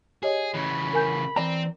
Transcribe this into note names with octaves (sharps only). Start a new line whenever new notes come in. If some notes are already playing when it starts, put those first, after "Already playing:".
G4 G#4 C#5 D#5
C#3 E3 B5
A#4 G#5 G6
E3 C4 D5 A#5